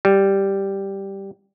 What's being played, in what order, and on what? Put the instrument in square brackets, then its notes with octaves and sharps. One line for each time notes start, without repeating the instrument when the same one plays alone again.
[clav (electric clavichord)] G3